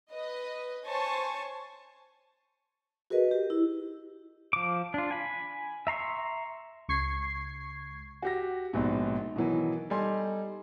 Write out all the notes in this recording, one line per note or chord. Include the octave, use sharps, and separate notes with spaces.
B4 D#5
C5 C#5 G#5 A5 C#6
F#4 G#4 A#4 B4 D#5
G4
E4
F3 D6
D4 F4
G#5 B5
E5 A#5 C6 C#6
C#2 C#6 G#6 C7
F#4 G4 A#6
A#1 G#2 B2
B2 D#3 E3 F#3
G3 D#4 A4 G#5 C6